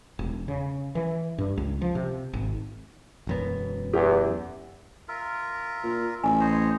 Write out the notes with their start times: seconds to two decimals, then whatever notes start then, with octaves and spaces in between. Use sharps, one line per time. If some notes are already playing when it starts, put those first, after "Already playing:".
0.19 E1
0.48 C#3
0.95 E3
1.38 G2
1.57 C#2
1.82 F3
1.95 C3
2.33 G#1
3.27 E1 F#2 B3
3.93 E2 G4 F#5
5.08 F4 A#4 E5
5.83 A#2
6.24 A1 G#5
6.40 C5 C#5 D#5